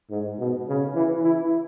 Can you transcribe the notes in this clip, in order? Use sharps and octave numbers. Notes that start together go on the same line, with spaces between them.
G#2
B2
C#3
E3
E4